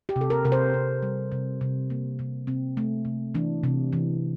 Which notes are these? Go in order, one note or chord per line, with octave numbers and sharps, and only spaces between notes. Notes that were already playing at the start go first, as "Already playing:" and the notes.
G4
C3
A4
A#4
C3 A#4
C5
C3
G3
C3
C3
A#3
C3
C3 C4
A3
C3
E3 D4
C3
E3